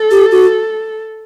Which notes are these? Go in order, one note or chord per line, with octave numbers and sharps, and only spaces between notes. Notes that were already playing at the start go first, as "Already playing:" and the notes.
Already playing: A4
G4
F#4